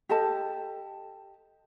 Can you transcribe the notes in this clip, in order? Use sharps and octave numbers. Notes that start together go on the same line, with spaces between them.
G4 A4 D#5 A5